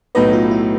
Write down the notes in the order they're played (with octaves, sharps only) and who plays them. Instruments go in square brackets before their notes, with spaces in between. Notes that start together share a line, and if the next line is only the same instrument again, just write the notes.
[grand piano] B1 A2 F#3 B3 D#4 [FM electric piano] B4
[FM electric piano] F4
E4